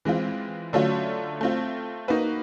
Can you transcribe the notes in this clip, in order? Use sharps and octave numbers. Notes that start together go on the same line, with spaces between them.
E3 G#3 C4 F4
D3 F#3 A3 C#4 F4
A3 C4 F4
A#3 D#4 F#4 B4